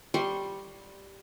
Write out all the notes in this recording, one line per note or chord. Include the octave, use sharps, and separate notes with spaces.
G3 C6 C#6